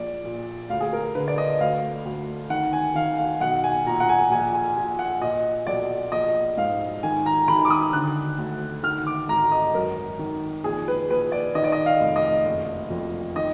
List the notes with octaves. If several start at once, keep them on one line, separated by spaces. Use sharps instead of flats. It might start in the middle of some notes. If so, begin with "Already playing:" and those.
Already playing: A#1 D5
A#2
D2 F5
G#4
A#4
D3 B4
D5
D#5
D2 F5
D2
D#3 F#5
G#5
D#3 F5
F5
B1 F#5
G#5
A#2 A#5
F#5
G#5
A#1 G#5
G#5
A#2 G#5
F#5
A#2 D#5
B1 D5
A#1 D#5
G#2 F5
D#3 G#5
A#5
D#3 B5
D6
D#6
D3 F#6
D2
D#3 F6
D6
G#1 A#5
D#5
F#2 A#4
D#3
A#1 G#4
B4
A#1 B4
D5
D#3 D#5
D5
D#5
F5
F1
D#5
F#1
F2
D#3 D#5